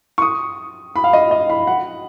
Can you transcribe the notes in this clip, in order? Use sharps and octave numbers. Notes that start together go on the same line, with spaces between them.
C#6
D#6
B5
F5
D#5
D#5
B5
F#5